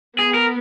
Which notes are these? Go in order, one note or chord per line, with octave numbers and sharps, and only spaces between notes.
B3 G#4
A#4